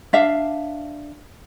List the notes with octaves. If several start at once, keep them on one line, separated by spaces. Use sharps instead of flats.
D4 E5 F5